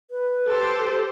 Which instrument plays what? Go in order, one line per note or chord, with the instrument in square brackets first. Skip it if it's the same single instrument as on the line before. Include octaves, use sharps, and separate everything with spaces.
[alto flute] B4
[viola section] G4 A4 C5